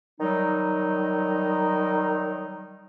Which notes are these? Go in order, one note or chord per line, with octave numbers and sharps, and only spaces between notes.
D#3 F#3 G3 D#4